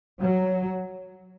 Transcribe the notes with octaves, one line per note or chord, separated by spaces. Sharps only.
F#3